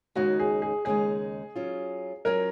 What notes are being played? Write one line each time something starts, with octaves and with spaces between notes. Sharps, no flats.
D#2 C#3 G#3 D#4 F#4
G#4
G#4
D#2 C#3 G#3 D#4 G#4
F#3 C#4 F4
F#3 C#4 F4 A#4